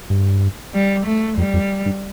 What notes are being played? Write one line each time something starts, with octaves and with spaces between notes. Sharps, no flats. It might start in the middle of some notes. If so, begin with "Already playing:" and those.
G2
G3
A3
F2 G3
F2
G2